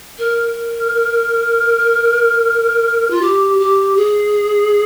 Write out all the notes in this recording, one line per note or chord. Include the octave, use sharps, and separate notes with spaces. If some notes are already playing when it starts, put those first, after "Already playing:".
A#4
F4
G4
G4
G#4